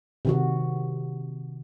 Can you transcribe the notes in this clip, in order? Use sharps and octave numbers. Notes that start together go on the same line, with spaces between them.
C3 D#3 F#4